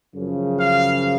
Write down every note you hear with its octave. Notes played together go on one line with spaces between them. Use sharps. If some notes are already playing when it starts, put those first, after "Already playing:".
F#2 C#3 F3
F5